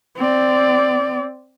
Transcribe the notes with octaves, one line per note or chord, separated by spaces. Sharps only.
C4 D5